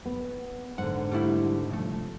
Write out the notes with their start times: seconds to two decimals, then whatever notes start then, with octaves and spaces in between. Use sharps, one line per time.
0.05 B3
0.78 G#2 D3 F#5
1.12 G3 A3 E4
1.69 C2 F2 A3